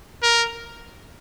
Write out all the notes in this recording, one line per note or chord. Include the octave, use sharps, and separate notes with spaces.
A#4